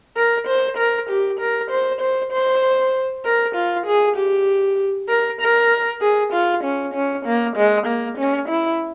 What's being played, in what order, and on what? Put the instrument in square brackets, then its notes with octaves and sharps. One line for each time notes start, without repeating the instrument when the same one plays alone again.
[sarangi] A#4
C5
A#4
G4
A#4
C5
C5
C5
A#4
F4
G#4
G4
A#4
A#4
G#4
F4
C#4
C#4
A#3
G#3
A#3
C#4
E4